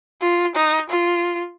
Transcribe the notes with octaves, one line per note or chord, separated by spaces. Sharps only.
F4
D#4
F4